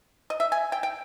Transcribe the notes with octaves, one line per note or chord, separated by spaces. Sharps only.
D#5
E5
G#5
G5
G5